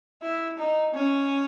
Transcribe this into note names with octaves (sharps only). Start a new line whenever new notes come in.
E4
D#4
C#4